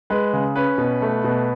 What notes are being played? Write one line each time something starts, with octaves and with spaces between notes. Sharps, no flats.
G#3 B4
C#3
C#4 B4
B2
A3
B2